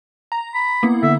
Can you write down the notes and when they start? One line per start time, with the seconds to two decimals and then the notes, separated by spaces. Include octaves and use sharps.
0.32 A#5
0.54 B5
0.83 A#3 B3 E4
1.03 D3 E5